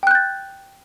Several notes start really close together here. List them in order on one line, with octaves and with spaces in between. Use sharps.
G5 F#6 G6 A6